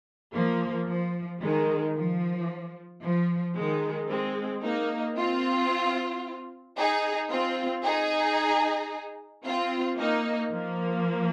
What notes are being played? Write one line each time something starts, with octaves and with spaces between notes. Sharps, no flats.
F3 A#3
F3
D#3 G#3
F3
F3
D#3 G#3
G#3 C4
A#3 D#4
C4 F4
D#4 G#4
C4 F4
D#4 G#4
C4 F4
A#3 D#4
F3 A#3